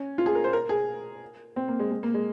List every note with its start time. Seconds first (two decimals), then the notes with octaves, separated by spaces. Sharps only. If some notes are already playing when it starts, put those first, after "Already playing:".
Already playing: C#4
0.18 F4
0.26 G#4
0.35 A#4
0.44 C5
0.53 A#4
0.69 G#4
1.56 C4
1.68 A#3
1.79 G#3
1.91 G#3
2.03 A#3
2.14 G#3